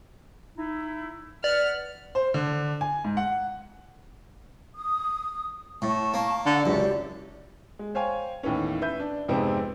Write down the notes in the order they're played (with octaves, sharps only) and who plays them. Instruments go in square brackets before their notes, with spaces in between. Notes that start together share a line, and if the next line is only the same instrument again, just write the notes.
[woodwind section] D#4 E4
[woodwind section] B4 F#5 [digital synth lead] D5 [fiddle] F6
[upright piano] C5
D3
G#5
G#2
F#5
[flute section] D#6
[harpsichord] A2 [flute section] A5 C#6
[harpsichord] A#3
[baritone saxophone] D3 [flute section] F#5
[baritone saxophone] C#2 [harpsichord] F#2 [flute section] E4 G4 D5
[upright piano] G#3
C5 C#5 F5 G5 G#5
D#2 A2 E3 B3 C#4
B4 E5 G6
D4
F2 G#2 C3 G#3 B3 C4